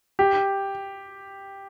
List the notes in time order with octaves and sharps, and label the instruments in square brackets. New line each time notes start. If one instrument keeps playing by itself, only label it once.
[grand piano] G4